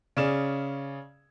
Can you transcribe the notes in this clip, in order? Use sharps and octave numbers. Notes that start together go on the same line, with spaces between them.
C#3 C#4 G#4 D5 E7